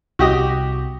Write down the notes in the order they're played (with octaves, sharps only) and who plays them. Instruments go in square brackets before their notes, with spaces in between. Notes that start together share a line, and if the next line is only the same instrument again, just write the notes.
[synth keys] C2 [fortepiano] F#4 G4 D#5